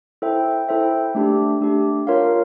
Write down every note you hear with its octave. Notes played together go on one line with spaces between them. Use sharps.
E4 A4 C5 E5 G5
E4 A4 C5 E5 G5
A3 D4 G4
A3 D4 G4
F4 A#4 C#5 F5